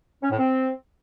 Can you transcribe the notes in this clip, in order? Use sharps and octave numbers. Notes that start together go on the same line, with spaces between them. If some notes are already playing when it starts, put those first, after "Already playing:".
C#4
A2
C4